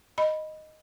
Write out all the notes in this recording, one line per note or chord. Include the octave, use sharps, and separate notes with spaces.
D#5 B5